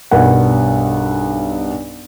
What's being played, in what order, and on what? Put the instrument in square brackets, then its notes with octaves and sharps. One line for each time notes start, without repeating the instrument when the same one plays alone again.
[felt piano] B1 G2 A#4 F#5